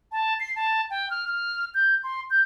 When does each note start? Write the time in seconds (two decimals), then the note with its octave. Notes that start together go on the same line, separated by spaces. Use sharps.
0.12 A5
0.40 C7
0.56 A5
0.90 G5
1.10 F6
1.28 F6
1.75 G6
2.04 C6
2.30 G6